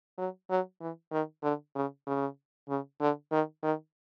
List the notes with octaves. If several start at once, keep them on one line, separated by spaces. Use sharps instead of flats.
F#3
F#3
E3
D#3
D3
C#3
C#3
C#3
D3
D#3
D#3